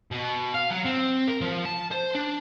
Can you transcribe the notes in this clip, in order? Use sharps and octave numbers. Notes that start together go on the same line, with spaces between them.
B2
F5
F#3
C4
A#4
F3
A5
C5
D4